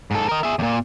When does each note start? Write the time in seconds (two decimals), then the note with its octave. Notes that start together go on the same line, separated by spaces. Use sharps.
0.11 G#2 A4
0.29 A#4 D#5
0.43 G#4 E5
0.59 E2 A#2